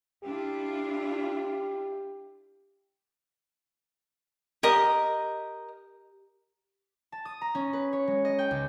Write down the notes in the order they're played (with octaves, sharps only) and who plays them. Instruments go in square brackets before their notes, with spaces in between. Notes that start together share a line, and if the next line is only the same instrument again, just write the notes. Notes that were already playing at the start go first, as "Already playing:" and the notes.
[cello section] D4 E4 F4 [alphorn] G4
[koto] G4 [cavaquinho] A#4 D#5 D#6
[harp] A5
D#6
A#5
C#4
B4
C#5
G#3
D#5
G5
C#2